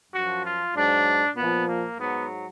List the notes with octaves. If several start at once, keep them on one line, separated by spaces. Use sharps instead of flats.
F#2 F3 F#4
F4
G#2 F#3 D4
A#2 F3 B3
A#3
G#2 F#3 B3